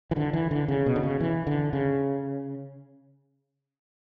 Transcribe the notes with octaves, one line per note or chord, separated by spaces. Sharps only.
E3
D3
E3
D3
C#3
B2
D3
C#3
E3
D3
C#3